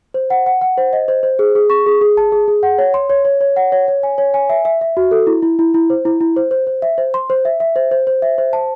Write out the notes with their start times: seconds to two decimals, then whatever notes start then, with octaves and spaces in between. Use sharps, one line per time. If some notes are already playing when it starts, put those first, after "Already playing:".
0.14 C5
0.30 F#5
0.46 F#5
0.61 F#5
0.78 C5
0.93 D#5
1.08 C5
1.23 C5
1.39 G#4
1.55 G#4
1.70 C#6
1.86 G#4
2.01 G#4
2.17 A5
2.32 G#4
2.48 G#4
2.63 F#5
2.78 C#5
2.94 C6
3.10 C#5
3.25 C#5
3.41 C#5
3.56 F#5
3.72 C#5
3.88 C#5
4.03 G#5
4.18 C#5
4.34 G#5
4.49 E5
4.65 E5
4.81 E5
4.97 F#4
5.11 A4
5.27 E4
5.42 E4
5.59 E4
5.74 E4
5.90 C5
6.05 E4
6.21 E4
6.37 C5
6.51 C5
6.67 C5
6.82 E5
6.98 C5
7.14 C6
7.30 C5
7.45 E5
7.60 E5
7.76 C5
7.91 C5
8.07 C5
8.22 E5
8.38 C5
8.53 A5